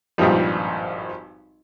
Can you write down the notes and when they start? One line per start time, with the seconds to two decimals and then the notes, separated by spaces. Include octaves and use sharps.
0.18 G#1 G2 A#2 F3 G3